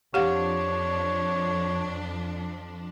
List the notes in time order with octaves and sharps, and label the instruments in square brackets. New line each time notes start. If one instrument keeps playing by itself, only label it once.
[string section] F2 F3 D4 [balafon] G4 F5 F#5 [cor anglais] C#5